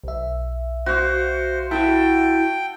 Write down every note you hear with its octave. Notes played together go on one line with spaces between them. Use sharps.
B1 E5
F#4 C5 F5
E4 F#4 A4 G5